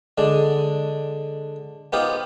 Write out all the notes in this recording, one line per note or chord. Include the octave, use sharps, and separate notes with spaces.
D3 G#3 D4
B3 D#4 F4 G4 C5